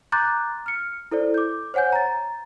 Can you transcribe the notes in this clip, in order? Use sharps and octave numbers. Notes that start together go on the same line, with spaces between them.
A#5 C6 D6 F#6 G6 A6
F6 C#7
E4 A4 C5 D5
D6 G6
C5 C#5 F#5 G#5 G6
A#5 A6